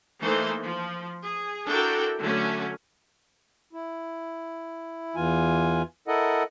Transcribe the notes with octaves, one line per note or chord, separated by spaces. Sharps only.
E3 A3 A#3 D#4 A4 C5
F3
G#4
D4 E4 F#4 A4 A#4 G5
D3 F#3 A3 C#4
E4
E2 E3 F4 G#5
E4 A4 A#4 D#5 F#5